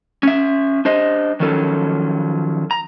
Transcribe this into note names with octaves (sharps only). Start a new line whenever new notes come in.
C#4 E5
D4 C5 D#5
D#3 F3 F#3 C#4 A4
A#5